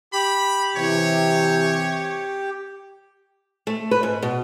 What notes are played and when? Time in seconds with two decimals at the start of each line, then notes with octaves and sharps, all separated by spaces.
0.13 G4 B5
0.77 C3 E3 C#5
3.67 A3
3.91 B4
4.03 G#2
4.23 B2